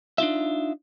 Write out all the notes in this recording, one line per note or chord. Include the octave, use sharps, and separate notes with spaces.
D4 D#4 F4 E5